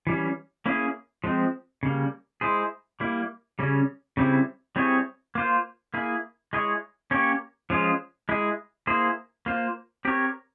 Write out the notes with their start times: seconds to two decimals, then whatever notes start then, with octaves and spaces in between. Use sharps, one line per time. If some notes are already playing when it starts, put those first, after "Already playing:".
0.07 E3 G3 C#4
0.66 A#3 C#4 E4 G#4
1.24 F3 G#3 C4
1.83 C#3 G3 A#3
2.41 G#3 E4 G#4 C5
3.00 G3 A#3 E4
3.59 C#3 G3 C#4
4.17 C#3 G3 C4 E4
4.76 G3 C4 E4 G#4 C#5
5.35 A#3 F4 C5
5.94 A#3 E4 G#4
6.53 G#3 E4 G#4 C#5
7.11 A#3 C#4 G4 C#5
7.70 F3 G#3 C#4 F4 G#4
8.29 G#3 E4 G#4
8.87 A#3 E4 G#4 C5
9.46 A#3 F4 C5
10.05 C4 G4 A#4 C#5